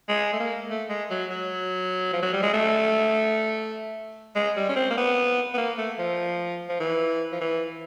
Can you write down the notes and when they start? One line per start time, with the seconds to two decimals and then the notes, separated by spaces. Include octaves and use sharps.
0.09 G#3
0.33 A3
0.39 A#3
0.70 A3
0.89 G#3
1.10 F#3
1.30 F#3
2.13 F3
2.22 F#3
2.33 G3
2.43 G#3
2.53 A3
4.36 G#3
4.57 G3
4.69 C#4
4.76 C4
4.90 A#3
4.97 B3
5.54 B3
5.58 A#3
5.78 A3
5.99 F3
6.69 F3
6.80 E3
7.32 F3
7.41 E3